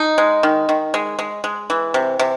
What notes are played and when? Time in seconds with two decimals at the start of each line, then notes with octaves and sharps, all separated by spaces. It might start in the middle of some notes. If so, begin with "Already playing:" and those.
Already playing: D#4
0.18 G#3
0.43 D#3
0.69 D#3
0.94 G#3
1.19 G#3
1.44 G#3
1.70 E3
1.94 C3
2.19 C3